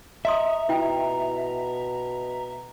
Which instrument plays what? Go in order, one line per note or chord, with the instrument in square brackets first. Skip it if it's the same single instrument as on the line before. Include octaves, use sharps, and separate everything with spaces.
[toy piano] D#5 C6 D#6 [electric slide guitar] E5 [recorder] A#5
[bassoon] B2 [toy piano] E4 F4 G5